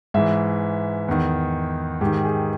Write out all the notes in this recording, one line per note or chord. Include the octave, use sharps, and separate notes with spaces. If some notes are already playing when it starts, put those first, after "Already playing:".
G#2 E3 E5
E2 D#3
G#2 D#3 G4
G#4